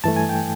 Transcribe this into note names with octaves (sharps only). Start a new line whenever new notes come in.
G2 E3 A3 A5
G#5
G5